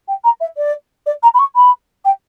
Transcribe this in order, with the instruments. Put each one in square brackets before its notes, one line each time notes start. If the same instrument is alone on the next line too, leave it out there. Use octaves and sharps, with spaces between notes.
[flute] G5
A#5
E5
D5
D5
A#5
B5
C#6
B5
G5